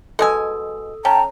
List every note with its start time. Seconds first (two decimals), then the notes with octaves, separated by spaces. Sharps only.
0.19 B2 G#3 A4 G#5 D#6 E6
1.05 C#4 G5 A5 A#5